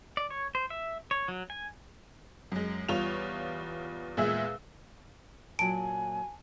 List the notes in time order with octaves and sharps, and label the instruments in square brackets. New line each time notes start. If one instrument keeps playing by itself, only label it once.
[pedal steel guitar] D5
C#5
C5
E5
C#5
F#3
G#5
[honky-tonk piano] F#2 G#3
E2 G3 F4 C#5 F7
E2 A#2 G#3 G#4 E5 E6
[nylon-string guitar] A#2 F#3 [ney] G#5 [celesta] A5 [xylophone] D7